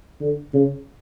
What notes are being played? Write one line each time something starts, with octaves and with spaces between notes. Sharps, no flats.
D3
C#3